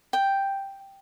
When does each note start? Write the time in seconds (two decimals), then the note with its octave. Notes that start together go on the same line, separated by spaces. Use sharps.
0.13 G5